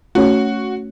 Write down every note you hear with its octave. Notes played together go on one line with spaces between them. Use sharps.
A3 C#4 F#4 C#5